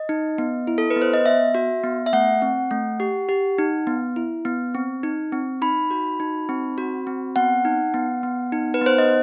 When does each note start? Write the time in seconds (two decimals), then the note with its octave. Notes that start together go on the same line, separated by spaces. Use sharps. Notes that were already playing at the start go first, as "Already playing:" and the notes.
Already playing: D#5
0.09 D#4
0.38 B3
0.67 E4
0.78 A4
0.90 B4
0.96 B3
1.02 C5
1.13 D#5
1.25 B3 E5
1.55 F#4
1.84 B3
2.06 E5
2.13 A3 F#5
2.42 C4
2.71 A3
3.00 G4
3.29 G4
3.58 D#4
3.87 B3
4.16 E4
4.45 B3
4.74 C4
5.03 D#4
5.32 C4
5.62 D#4 B5
5.91 F#4
6.20 D#4
6.49 C4
6.78 F#4
7.07 C4
7.36 B3 F#5
7.65 D#4
7.94 B3
8.23 B3
8.52 D#4
8.74 B4
8.81 B3 C5
8.98 D#5